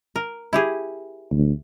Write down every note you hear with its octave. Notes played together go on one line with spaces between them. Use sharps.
A#4
E4 G4 G#4
D2